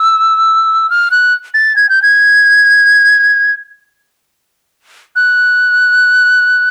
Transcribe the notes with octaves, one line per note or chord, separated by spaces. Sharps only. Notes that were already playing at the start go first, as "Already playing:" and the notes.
Already playing: E6
F6
F#6
A6
G#6
G6
G#6
F#6